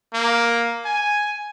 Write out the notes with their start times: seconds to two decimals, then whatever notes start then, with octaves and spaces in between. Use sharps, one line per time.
0.14 A#3
0.85 G#5